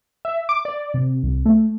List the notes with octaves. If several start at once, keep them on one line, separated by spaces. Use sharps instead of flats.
E5
D6
D5
C3
C2
A3